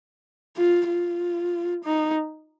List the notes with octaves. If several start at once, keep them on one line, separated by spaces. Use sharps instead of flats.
F4
F4
D#4